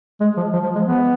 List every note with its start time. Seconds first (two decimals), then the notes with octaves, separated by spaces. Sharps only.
0.21 G#3
0.36 F3
0.53 F3
0.63 F3
0.75 G#3
0.85 B3